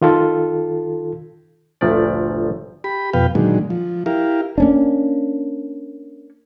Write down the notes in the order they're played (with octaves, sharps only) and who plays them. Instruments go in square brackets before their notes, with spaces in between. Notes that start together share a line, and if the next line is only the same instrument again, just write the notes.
[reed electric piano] D#3 F4 A4
[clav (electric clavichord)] G1 D2 A#2 F3 A3 D5
[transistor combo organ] G4 B5
F2 B2 B4 F5 G5
A#2 D3 D#3 F#3 G#3
F3
E4 G4 A#4 F5
[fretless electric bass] A#3 C#4 D4